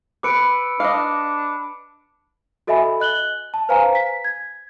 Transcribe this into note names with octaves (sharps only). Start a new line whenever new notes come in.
B4 D6 E6 C#7 D7
D4 D#5 F5
F#4 A4 D#5 E5 G#5 B5
D#5 F#6 F#7 G7
A5
B4 C5 F5 G#5 A#5
B6
G#6